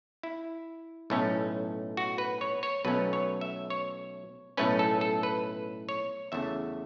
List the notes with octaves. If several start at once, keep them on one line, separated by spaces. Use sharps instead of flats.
E4
B1 A2 A3 C#4
F#4
B4
C#5
C#5
B1 B2 F#3 A3 C#4 B4
C#5
E5
C#5
B1 A2 A3 C#4 B4
A4
A4
B4
C#5
E2 C#3 A3 E5